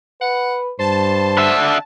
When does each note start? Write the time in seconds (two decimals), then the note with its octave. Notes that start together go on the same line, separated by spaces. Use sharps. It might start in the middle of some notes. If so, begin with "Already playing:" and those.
0.21 B4 F#5
0.79 G2 C5 A5
1.38 D3 E5